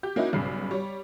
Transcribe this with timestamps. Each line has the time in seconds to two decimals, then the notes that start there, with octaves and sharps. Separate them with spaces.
0.03 G4 G6
0.16 A#3 C#4 D#4 E4 F#4
0.33 B1 G2 C#3 C7
0.71 G3 C#5